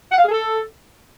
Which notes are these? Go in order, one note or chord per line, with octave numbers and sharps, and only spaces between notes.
F#5
F5
G#4
A4